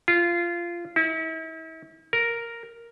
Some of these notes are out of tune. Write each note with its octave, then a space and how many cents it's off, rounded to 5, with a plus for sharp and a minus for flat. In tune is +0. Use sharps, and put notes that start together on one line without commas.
F4 -20
E4 -40
A#4 +0